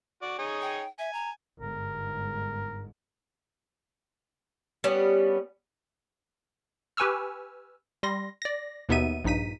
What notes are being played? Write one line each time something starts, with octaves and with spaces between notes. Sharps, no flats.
F#4 D5
D#4 G#4 C#5
G5
E5 G#5
A#5
G1 G#2 A#4
G3 B3 C#4
G4 B4 G#5 C#6 E6 F6
G3 C6 A#6
D5 A#6
D#2 B2 B3 D#4 E5 D#7
A#1 G2 D#4 B6 D#7